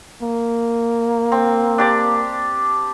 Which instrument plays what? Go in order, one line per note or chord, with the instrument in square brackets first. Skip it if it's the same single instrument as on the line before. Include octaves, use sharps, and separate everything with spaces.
[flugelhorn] A#3
[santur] C4
D4 G4 D5